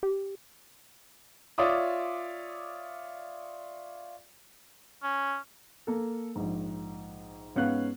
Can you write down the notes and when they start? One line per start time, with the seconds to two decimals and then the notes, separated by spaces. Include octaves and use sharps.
0.03 G4
1.58 F4 C#5 D5 E5 D6 D#6
5.03 C#4
5.87 A#3 A4
6.36 A#1 G#2
7.56 G#2 B3 C#4 F5 F#6